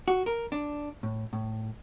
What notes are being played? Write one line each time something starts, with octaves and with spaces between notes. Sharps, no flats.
F#4
A#4
D4
A2
A2